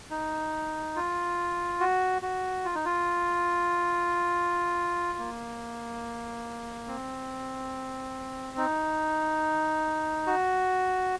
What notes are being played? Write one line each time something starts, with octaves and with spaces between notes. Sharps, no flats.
D#4
F4
F#4
F#4
F4
D#4
F4
A#3
C4
D#4
F#4